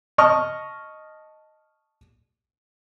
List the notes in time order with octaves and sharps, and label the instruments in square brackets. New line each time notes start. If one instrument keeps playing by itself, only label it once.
[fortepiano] D#5 A5 C#6 D#6 F6